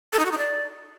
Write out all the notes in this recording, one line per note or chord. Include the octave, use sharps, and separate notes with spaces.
A4
D#4
F#4
D#4
D5